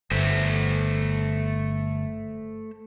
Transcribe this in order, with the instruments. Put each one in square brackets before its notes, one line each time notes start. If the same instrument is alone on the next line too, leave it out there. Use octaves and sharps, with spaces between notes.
[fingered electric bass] G1 [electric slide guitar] A3 C5 E5